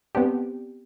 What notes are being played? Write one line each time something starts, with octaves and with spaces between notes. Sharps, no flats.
B3 C4 D4 G4